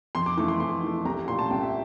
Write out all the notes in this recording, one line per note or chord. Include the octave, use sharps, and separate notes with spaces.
F2 C6
D6
E3 A3 D6
C6
F2 C6
E3 A3
C2 A#5
A#2 A3 C6
A5
C2 G5
E5